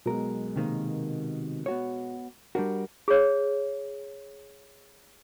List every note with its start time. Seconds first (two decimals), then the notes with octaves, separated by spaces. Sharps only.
0.06 B1 B2 G#3 A#4
0.56 C3 D#3 A#3
1.66 B3 F#4 C#5
2.55 G3 D4 F#4 A#4
3.08 G#4 C#5